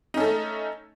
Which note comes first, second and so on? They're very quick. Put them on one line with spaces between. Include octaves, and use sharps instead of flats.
D#4 C#4 A4 A3